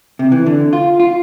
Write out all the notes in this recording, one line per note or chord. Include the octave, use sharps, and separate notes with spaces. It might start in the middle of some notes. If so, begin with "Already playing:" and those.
C3
E3
D3
F4
F4